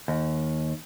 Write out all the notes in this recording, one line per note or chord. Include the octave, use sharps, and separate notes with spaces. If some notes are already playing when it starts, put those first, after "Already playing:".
D#2